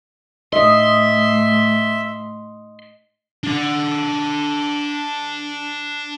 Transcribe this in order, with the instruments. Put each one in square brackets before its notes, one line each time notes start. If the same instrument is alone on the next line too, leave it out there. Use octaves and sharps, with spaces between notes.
[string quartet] A2 [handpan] D#5 [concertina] E5 [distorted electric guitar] C6
[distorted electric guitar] D4 F#5